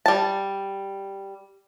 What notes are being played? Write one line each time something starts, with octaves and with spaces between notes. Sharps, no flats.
G3 A5